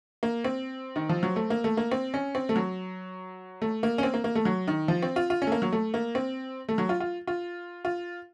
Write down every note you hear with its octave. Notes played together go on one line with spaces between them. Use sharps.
A#3
C4
D#3
F3
F#3
A3
A#3
A3
A#3
C4
C#4
C4
A3
F#3
A3
A#3
C#4
C4
A#3
A#3
A3
F#3
D#3
F3
C4
F4
F4
C#4
A3
A#3
F#3
A3
A#3
C4
A3
F#3
F4
F4
F4
F4